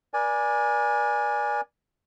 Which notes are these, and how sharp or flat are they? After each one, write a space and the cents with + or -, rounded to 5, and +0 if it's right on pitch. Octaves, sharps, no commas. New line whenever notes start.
A#4 +45 D5 +0 G#5 +0